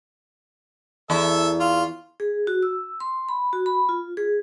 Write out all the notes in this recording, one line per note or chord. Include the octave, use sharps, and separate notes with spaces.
E2 A4 E5
F4
G#4
F#4
E6
C6
B5
F#4
B5
F4
G#4